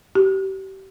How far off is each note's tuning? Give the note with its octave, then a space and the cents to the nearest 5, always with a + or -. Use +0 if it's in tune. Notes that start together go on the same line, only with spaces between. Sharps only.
G4 -35